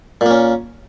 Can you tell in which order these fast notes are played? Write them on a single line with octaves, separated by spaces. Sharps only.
A#2 A#3 C#4